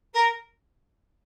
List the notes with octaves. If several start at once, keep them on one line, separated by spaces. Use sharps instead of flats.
A#4